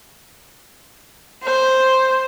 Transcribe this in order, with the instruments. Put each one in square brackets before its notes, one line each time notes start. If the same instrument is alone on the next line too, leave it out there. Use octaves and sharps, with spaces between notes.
[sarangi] C5